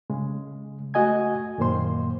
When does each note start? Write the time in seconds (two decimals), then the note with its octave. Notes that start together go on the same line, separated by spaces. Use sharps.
0.10 C#3 G#3
0.94 A3 F#4 D#5 G#5 G#6
1.58 F#2 A#2 D#3 A#3 C5 C6